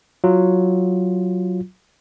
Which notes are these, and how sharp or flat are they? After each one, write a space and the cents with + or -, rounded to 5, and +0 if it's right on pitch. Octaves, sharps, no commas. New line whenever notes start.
F#3 +0 F4 +0